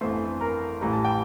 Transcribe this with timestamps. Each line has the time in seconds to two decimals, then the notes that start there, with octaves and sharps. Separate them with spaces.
0.01 G1 F2 E3 A3 C5 C6
0.41 A#4 A#5
0.81 A1 A2 E3 G3 A#5
0.93 A5
1.05 G5